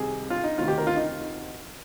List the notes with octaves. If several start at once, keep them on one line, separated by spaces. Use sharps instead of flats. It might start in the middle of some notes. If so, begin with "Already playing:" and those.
Already playing: C2 C3 D#3 G#4
F4
D#4
D2 C3 D#3 F4
G4
A#4
F4
D#4